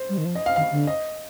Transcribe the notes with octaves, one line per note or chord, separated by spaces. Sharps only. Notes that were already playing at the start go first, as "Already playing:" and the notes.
Already playing: C5
G3
D#3
F3
D#5
F5
D#3 F5
D3
D#5